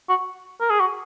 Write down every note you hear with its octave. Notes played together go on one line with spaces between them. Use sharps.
F#4
A#4
G#4
F#4